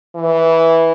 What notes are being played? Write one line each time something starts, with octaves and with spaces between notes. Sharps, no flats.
E3